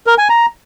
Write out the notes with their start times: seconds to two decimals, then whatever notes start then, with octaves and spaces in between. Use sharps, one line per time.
0.07 A#4
0.18 G#5
0.29 A#5